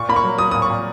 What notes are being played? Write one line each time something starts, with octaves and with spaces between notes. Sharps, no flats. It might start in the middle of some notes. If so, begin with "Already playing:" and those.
Already playing: A#2 C#6
A#3 B5
C#6
F#3
F#3 D#6
A#2 D#6
C#6
A#2